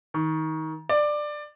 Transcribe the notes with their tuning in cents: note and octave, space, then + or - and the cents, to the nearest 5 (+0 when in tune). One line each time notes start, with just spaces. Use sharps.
D#3 +25
D5 +15